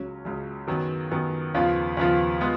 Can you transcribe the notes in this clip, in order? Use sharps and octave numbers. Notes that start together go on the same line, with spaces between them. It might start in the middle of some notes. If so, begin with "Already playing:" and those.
Already playing: C#2 C#3 F#3 C#4
C#2 C#3 F#3 C#4
F#2 D#3 F#3 B3
F#2 D#3 F#3 B3
D#2 C#3 F3 B3 F4
D#2 C#3 F3 B3 F4
G#3 B3 F4